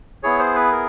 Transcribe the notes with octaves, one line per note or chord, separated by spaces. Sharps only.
B3 E4 G#4 C#5
C5
B4
A#4